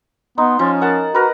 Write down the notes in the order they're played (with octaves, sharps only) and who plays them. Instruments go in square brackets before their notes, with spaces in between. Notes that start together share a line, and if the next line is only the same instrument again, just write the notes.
[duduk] B3 [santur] D#4 [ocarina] C6
[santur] F3 [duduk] C#4
[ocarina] A#4 [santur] F#5 A5
[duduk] F#4 [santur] A#4 B4